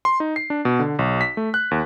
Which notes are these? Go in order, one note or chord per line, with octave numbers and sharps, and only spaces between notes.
C6
D#4
C7
D4
B2
D3
B1
B6
A3
F#6
D#2